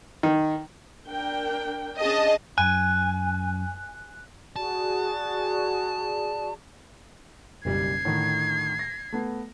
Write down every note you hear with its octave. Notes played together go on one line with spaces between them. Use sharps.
D#3
D4 A#4 G5
C#4 D4 G#4 D#5 A5
F#2 G#5 F#6
F#4 G#4 D5 A5
F#1 B1 G3 G#6 C7
A2 D3 D#3
A#6
A3 B3